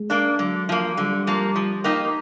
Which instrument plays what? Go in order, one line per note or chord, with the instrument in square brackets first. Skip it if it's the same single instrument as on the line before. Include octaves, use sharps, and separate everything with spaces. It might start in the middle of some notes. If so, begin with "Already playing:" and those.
Already playing: [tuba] G#3
[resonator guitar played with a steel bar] A#3 D4
[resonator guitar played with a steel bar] D3 [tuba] F#3
[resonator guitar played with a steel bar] F3 A#3
[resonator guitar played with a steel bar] D3 [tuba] G3
[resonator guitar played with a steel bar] F3 A#3
F3
A#3 D#4 G4